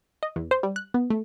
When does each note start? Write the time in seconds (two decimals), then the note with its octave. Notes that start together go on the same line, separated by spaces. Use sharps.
0.23 D#5
0.36 E2
0.51 C5
0.63 G3
0.76 F#6
0.94 B3
1.10 A3